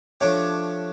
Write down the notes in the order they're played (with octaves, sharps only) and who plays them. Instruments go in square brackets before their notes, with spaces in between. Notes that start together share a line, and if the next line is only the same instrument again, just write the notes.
[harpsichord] F3 A3 D4 G4 [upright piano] C#5